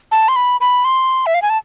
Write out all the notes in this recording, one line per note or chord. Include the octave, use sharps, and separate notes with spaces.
A5
C6
B5
B5
C6
E5
F5
G#5
A5